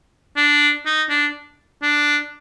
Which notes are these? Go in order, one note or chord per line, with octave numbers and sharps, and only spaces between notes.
D4
D#4
D4
D4